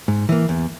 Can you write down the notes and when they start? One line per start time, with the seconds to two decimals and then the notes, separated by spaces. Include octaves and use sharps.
0.08 G#2
0.29 E3 A#3
0.49 E2